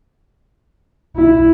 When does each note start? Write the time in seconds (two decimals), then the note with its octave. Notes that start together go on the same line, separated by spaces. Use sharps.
1.17 E4